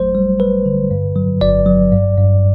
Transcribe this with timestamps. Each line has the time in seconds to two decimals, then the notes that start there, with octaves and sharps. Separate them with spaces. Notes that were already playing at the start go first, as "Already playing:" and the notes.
Already playing: G1 F#3 A3 C5
0.15 G3
0.40 G3 B4
0.66 D3
0.91 G2
1.16 F#3
1.41 G1 D5
1.66 F#3
1.92 G2
2.17 G2